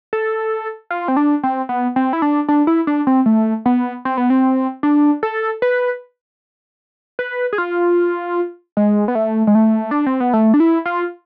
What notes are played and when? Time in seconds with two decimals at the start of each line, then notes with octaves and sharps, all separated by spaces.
0.13 A4
0.91 F4
1.08 C4
1.17 D4
1.43 C4
1.69 B3
1.96 C4
2.13 E4
2.22 D4
2.49 D4
2.67 E4
2.87 D4
3.07 C4
3.26 A3
3.66 B3
4.05 C4
4.17 B3
4.30 C4
4.83 D4
5.23 A4
5.62 B4
7.19 B4
7.53 G#4
7.58 F4
8.77 G#3
9.08 B3
9.15 A3
9.47 G#3
9.55 A3
9.91 D4
10.06 C4
10.20 B3
10.33 A3
10.54 D4
10.60 E4
10.86 F4